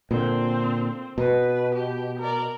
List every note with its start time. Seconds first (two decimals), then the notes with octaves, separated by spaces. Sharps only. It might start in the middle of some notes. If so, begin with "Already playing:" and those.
0.11 A#2 D3 C4
1.18 B2 B4
1.75 G4
2.20 A#4 D5